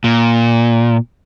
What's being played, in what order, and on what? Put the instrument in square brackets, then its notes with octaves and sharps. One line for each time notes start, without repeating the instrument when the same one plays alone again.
[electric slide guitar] A#2